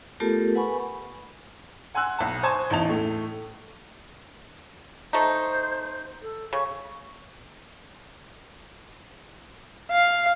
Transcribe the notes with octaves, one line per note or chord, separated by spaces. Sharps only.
A3 B3 F4 G4 A4 A#4
B4 F#5 G#5 B5 C#6
F#5 G#5 C6 E6 F#6
B1 A5
C5 G#5 A5 C#6 D#6 G#6
A1 E2 D#4 A5 F7
A2 A3
A3 D#4 C5
A4
C#3 C#6
F5